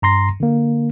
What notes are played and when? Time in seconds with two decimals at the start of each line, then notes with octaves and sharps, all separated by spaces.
0.02 G2 A#5 C6 A#6
0.40 D3 A#3